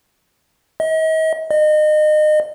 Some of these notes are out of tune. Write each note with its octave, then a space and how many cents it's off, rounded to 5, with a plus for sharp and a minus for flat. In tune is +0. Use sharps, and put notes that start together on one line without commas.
D#5 +40
D#5 -30